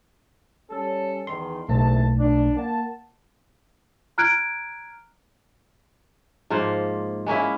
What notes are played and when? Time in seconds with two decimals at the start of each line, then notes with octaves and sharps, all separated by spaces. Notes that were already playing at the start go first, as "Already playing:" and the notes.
0.70 G3 C#4 A4
1.27 E2 D#3 C6
1.69 F#1 B1 E2 A3 A5
2.18 D4
2.56 A#3 F#5 A5
4.18 A#5 F6 F#6 G#6 D7
6.50 G#2 F3 A#3 C5
7.26 G#3 A#3 C#4 E4